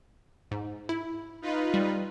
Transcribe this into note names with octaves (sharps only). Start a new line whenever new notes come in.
G#2
E4
D#4 F4 B4
G3